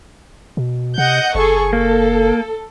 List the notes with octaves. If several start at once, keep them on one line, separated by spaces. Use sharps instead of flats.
B2
C3 D#5 F#5 G6
F#1 G#4 A4 C#6
A#3 A4